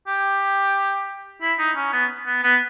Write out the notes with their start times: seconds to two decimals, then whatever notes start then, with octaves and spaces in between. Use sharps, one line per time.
0.07 G4
1.42 E4
1.59 D#4
1.76 C#4
1.93 B3
2.27 B3
2.43 B3